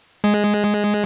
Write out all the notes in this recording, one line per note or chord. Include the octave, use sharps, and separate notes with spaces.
G#3